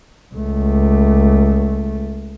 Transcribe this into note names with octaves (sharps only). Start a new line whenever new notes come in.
C#2 A3